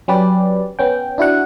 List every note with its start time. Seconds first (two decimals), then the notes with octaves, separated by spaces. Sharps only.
0.08 F#3 C#4 G4 B4 D5
0.79 B3 C#4 G5
1.18 D4 E4 F#4 F#5